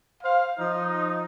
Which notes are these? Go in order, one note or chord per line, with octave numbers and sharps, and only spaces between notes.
C5 F5
F3 D#4